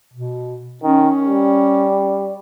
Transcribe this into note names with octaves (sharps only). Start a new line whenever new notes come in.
B2
D#3 C#4
G3